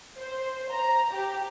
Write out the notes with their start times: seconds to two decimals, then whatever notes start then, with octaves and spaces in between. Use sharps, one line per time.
0.18 C5
0.70 A#5
1.11 G4